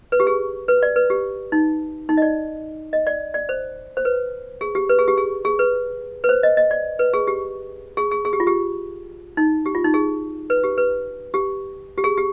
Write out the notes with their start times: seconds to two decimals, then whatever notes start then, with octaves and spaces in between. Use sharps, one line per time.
0.12 B4
0.20 G4
0.27 G#4
0.68 B4
0.83 D5
0.96 B4
1.10 G4
1.52 D#4
2.09 D#4
2.17 D#5
2.22 D5
2.93 D#5
3.07 D5
3.34 D5
3.49 C5
3.97 C5
4.05 B4
4.61 G#4
4.75 G4
4.89 B4
4.99 G#4
5.08 G4
5.18 G#4
5.45 G#4
5.59 B4
6.24 B4
6.29 C5
6.43 D#5
6.57 D#5
6.71 D5
6.99 B4
7.13 G#4
7.27 G4
7.97 G#4
8.12 G#4
8.25 G#4
8.33 G4
8.40 F4
8.47 G4
9.37 D#4
9.66 G4
9.75 F4
9.84 D#4
9.94 G#4
10.50 B4
10.64 G4
10.78 B4
11.34 G4
11.98 G4
12.04 G#4
12.17 G4